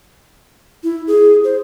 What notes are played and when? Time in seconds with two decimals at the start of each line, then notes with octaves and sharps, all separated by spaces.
0.84 E4
1.07 G#4
1.44 C5